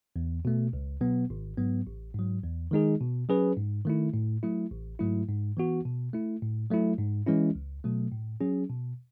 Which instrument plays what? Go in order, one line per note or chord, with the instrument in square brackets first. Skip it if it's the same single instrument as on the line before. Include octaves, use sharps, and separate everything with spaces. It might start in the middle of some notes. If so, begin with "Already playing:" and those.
[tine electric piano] E2
B2 A3
C#2
B2 F#3 B3
G#1
G#2 F#3 B3
A1
G#2 F#3
E2
D#3 G#3 D#4 G#4
B2
F#3 C#4 G#4 B4
G#2
D#3 A3 E4
A2
F#3 A3 E4
A1
G#2 F#3 A3 E4
G#2
E3 B3 F#4
B2
A3 E4
A2
F#3 A3 E4
G#2
E3 G#3 C#4 E4
C#2
B2 F#3 A3
A2
F#3 C#4 G#4
B2